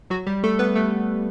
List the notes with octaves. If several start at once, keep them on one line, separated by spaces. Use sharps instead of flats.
F#3 F#4
G3 G4
A3 A4
B3 B4
A3 A4